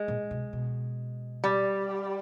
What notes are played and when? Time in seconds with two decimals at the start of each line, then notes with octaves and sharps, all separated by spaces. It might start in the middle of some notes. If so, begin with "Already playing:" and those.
Already playing: G#3
0.08 A#2
0.31 B2
0.53 B2
1.44 G3